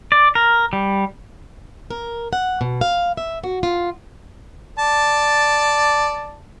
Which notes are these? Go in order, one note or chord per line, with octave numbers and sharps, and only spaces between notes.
D5
A#4
G3
A#4
F#5
B2
F5
E5
F#4
F4
D5 A5